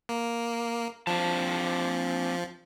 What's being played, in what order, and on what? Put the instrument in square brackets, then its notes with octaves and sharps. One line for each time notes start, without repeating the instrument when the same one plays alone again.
[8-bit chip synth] A#3
[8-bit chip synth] F3 [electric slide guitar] C4 D4 A5